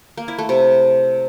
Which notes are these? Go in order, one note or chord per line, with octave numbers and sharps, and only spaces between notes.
A#3
E4
A3
C3